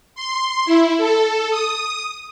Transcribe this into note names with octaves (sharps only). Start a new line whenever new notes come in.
C6
E4
A4
D#6